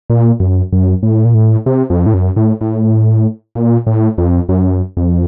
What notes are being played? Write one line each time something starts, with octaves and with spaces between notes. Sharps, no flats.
A#2
F#2
F#2
A2
A#2
A2
C3
F2
A2
F#2
A2
A2
A#2
A2
F2
F#2
F2